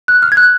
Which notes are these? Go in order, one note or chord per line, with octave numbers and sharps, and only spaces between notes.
F#6
F6
G#6
F#6